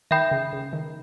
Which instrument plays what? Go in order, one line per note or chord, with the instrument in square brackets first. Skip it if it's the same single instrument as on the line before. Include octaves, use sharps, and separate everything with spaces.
[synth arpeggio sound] D#3 [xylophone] E5 G5 B5 D#6 G6
[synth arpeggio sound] C#3
C#3
D#3